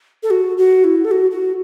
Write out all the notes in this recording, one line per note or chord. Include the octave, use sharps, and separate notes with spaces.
A4
F#4
F#4
E4
A4
F#4
F#4